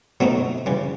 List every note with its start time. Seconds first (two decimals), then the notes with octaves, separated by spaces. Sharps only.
0.20 B2 F#3 A3 C4 D#4
0.66 C#3 E3 G3